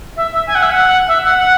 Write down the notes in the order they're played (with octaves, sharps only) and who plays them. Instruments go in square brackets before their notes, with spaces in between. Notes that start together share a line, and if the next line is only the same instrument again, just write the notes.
[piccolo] E5
E5
G#5
F#5
E5
F#5
E5
F#5
F#5